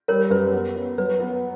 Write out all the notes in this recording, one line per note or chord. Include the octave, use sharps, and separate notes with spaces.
G3 A#4 C#5
F#2 B4
B3
B3
F#3 B4
B3